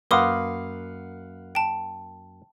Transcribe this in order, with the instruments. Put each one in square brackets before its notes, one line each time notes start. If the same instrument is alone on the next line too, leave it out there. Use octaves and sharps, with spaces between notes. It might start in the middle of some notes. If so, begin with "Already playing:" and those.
[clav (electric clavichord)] F#2 A#3 [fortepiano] B4 F5 F#5 [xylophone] C6 D6 D#6
[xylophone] G5 A5